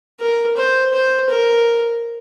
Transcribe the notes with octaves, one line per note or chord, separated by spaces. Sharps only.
A#4
C5
C5
A#4